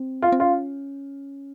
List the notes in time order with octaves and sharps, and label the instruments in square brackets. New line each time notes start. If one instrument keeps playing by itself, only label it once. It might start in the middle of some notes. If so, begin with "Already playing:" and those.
Already playing: [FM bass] C4
[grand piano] F4
[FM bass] C4
[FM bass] C#4 [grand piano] F4